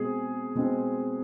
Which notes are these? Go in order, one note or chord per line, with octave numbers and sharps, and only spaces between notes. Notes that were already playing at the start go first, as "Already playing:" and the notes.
Already playing: B2 G#3 C4 G#4
B2 G#3 C4